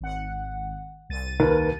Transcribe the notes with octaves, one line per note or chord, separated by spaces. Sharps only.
G#1 F#5
C2 A6 D#7
D#2 A#4 B4